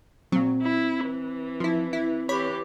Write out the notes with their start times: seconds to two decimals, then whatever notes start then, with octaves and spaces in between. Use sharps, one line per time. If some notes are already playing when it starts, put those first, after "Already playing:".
0.32 A#2 F#3 C4
0.62 E4
1.06 E3
1.60 F3 E4
1.93 E4
2.29 E3 G4 C#5 B5